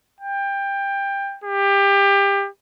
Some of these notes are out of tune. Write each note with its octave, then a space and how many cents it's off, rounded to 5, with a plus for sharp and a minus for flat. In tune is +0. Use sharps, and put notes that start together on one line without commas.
G5 +20
G4 +25